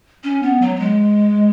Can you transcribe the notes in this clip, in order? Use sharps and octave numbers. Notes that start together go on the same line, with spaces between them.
C#4
B3
F#3
F#3
G#3